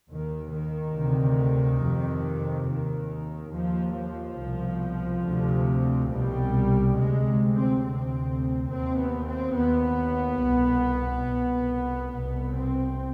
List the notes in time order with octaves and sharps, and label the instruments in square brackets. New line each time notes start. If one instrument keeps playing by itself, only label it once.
[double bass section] D#2 D#3
D#3
D2 C3
F2 C3
D#2 D#3
D#2 F3
F3
C2 B2
D2 C3
C2 B2 G3
D2 C3 G#3
C4
D2 C3 C4
D#2 C4
B3
C4
D#2 B3
C2 B2
C2 B2
C2 B2 B3
C4